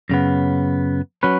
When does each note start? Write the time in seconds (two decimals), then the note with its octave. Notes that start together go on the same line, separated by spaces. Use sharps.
0.09 F#2 C#3 B3
1.23 F#3 C#4 B4